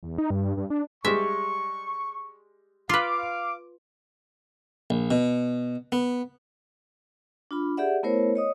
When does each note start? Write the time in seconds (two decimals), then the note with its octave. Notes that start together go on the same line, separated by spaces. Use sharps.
0.03 E2
0.18 D#4
0.30 G2
0.45 G2
0.57 G2
0.70 D4
1.05 G3 G#3 E5 C#6
2.89 F4 B4 F5 D6
4.90 A#1
5.11 B2
5.92 B3
7.51 D4 F4 B5
7.77 G4 G#4 D5 E5 F#5
8.03 A3 B3 E4 A#4 C5 C#5
8.35 C#5 D#5 D#6